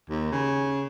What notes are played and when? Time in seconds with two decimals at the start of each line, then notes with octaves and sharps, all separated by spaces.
0.09 D#2
0.32 C#3